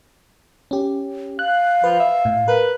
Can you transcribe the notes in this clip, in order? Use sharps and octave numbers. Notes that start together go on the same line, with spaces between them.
C#4 G4
F5 F#6
F3 B4
E5
A2
A#4 B4